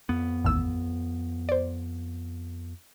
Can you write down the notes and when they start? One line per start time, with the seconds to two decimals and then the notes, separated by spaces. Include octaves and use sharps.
0.09 F2 B3
0.44 A1 D#2 E6
1.49 C5 D5